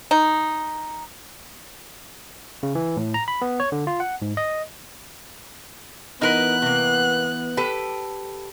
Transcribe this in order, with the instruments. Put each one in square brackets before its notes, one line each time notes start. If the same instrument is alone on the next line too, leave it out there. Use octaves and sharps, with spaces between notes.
[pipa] D#4
[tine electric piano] C#3
E3
A2
A#5
B5
B3
C#5
D3
F4
F#5
G#2
D#5
[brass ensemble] E3 B3 [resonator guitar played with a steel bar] D#4 A#4 B4 [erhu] F#6
[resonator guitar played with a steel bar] C3 A#3
G4 A4 B4